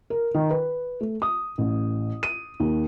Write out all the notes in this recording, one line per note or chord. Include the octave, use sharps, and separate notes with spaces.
A#4
D#3
B4
A3
D#6
A1
D#7
D#2